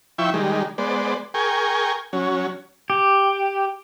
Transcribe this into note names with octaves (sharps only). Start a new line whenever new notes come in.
F3 E4 E5 G5 C#6
D#3 G3 G#3
G#3 B3 C5 D5
G#4 A#4 G5 G#5 C#6
F#3 C#4
G4